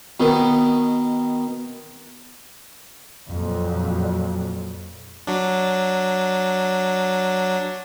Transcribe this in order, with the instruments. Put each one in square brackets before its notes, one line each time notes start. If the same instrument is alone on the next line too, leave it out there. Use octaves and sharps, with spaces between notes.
[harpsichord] B2 D#3
[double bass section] F2 A#2 F#3
[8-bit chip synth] F#3 D4